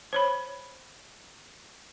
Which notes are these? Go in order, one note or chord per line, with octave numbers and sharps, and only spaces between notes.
C5 C#5 B5